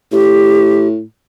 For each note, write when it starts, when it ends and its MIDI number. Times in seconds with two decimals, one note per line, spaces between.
0.12 1.02 45
0.12 0.87 67